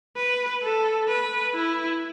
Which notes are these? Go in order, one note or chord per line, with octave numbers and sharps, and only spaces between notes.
B4
A4
B4
E4